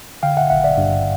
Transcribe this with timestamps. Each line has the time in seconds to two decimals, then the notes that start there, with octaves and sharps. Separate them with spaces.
0.23 D3 F5 G5
0.37 E5 F#5
0.50 G#1 E5 F#5
0.64 D5 E5
0.78 G2